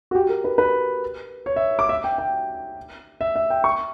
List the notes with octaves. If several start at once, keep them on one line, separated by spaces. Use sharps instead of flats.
F#4
G4
A#4
B4
B4
C#5
E5
D6
E5
G5
G5
E5
E5
G5
C#6